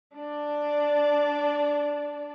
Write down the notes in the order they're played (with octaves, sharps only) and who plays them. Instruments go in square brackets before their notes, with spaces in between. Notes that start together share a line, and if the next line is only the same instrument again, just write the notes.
[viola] D4 D5